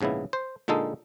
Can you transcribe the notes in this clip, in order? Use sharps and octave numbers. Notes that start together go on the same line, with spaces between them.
A#1 G#2 C#3 B3 E4
C5
A#2 D3 G#3 D#4 A4